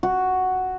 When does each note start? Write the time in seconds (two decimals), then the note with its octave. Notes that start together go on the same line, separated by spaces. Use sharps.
0.03 F#4